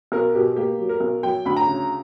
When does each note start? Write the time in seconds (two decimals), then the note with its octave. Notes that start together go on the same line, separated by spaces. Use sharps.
0.12 B1 A#4
0.35 B2 G4
0.56 A#3 G4
0.79 F#3
0.89 A#4
1.00 B1
1.23 F#3 G5
1.45 D2 B5
1.56 A#5
1.67 C#3